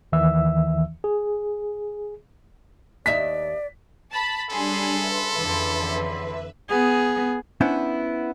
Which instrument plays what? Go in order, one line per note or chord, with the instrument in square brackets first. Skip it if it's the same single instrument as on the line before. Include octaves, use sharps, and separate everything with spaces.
[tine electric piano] D#2 D#3 E3 E5 E6
G#4
[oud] D#2 D#4 E5 [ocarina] D5 [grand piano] B6
[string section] A5 B5
[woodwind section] C#3 B5 C6 [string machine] G3 D4 [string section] G#4 [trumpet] A4
[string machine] B4 E5
[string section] F2 D3 E3
[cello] B3 G#4
[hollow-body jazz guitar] B3 C#4 D4 E4 C5